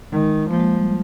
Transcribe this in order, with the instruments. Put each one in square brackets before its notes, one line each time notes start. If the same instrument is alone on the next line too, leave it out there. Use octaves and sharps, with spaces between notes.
[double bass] D#3 [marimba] G#3
[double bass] F3 [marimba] A#3
[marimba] G#3
G3